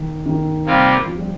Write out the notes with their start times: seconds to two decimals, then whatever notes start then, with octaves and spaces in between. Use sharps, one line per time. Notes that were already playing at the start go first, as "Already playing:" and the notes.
Already playing: D#3
0.26 D#3
0.65 C3 G3 A#3 F4
1.06 F3
1.16 G3